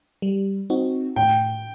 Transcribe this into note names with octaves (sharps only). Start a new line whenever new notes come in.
G3
C4 D#4 F#4
A2 G5